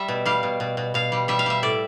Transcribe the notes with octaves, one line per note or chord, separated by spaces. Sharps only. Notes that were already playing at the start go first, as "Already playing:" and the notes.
Already playing: G3 E5
B2
G3 F5
B2
B2
B2
B2 F5
G3
G3 E5
F5
G3 E5
A2 D5